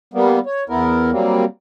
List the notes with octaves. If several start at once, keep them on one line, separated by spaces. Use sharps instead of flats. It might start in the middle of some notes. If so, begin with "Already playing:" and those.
G3 A#3 B3
C#5
E2 B3 E4 A#4
F#3 G3 A#3 C4